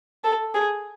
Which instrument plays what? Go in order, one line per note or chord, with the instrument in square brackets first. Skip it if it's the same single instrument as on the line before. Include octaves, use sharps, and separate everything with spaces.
[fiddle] A4
G#4